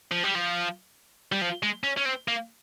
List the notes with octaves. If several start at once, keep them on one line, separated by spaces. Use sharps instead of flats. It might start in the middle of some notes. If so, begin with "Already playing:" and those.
F3
G3
F3
G3
F3
G#3
C#4
C#4
C4
A#3